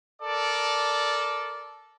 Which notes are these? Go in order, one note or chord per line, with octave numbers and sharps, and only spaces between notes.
A4 A#4 D5